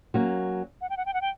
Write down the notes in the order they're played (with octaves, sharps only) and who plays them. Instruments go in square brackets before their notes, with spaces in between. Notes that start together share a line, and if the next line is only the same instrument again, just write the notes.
[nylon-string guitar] F#3 A#3 C#4
[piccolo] F#5
G5
F#5
G5
F#5
G5